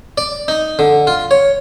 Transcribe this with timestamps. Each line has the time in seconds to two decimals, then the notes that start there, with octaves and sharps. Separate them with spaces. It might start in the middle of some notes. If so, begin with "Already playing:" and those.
0.18 D5
0.48 D#4
0.79 D3
1.07 F4
1.31 C#5